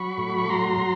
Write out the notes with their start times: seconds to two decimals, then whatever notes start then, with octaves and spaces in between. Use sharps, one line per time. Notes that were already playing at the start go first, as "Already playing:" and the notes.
Already playing: F#3 B5 C#6
0.18 A2
0.38 C#6
0.50 F#3 A#5 C6